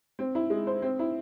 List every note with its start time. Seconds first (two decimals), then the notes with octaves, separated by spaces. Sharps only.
0.19 C4
0.35 E4
0.50 G#3
0.67 C5
0.82 C4
0.99 E4